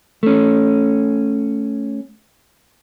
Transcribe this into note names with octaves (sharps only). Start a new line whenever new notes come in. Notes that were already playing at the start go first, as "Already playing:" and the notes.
A3 C#4